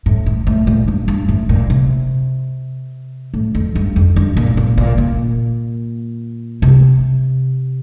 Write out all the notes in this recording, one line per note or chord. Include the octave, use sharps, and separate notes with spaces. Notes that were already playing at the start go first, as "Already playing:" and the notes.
A2
A2
A2
A#2
G2
G2
A2
A#2
C3
A2
F2
G2
F2
G2
A#2
A#2
A#2
A#2
C3